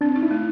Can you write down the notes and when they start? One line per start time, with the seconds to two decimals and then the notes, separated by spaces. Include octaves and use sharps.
0.01 C4 D4
0.16 D#4
0.23 E4
0.31 A3